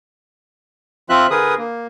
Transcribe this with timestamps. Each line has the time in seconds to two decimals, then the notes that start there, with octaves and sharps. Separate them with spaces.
1.10 F3 C4 F4 E5 F#6
1.30 D3 G#4 A#4 B4 D#6
1.58 A#3